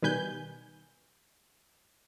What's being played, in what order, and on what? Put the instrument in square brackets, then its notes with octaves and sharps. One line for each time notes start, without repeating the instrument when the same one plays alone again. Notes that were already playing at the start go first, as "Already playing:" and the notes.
[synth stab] B2 D#3 G3 B4 G#5 G6